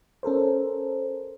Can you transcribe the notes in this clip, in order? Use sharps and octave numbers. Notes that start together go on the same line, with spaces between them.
C#4 A4 A#4 C5